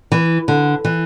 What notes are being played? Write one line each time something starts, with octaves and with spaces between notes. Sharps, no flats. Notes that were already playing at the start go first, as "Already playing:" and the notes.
E3
D3
E3